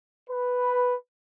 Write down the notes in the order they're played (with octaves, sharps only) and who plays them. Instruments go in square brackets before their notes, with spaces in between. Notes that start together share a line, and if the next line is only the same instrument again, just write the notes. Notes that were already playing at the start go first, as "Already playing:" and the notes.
[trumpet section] B4